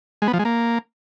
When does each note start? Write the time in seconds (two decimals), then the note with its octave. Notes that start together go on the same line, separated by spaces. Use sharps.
0.22 G#3
0.28 B3
0.33 F3
0.39 G#3
0.45 A#3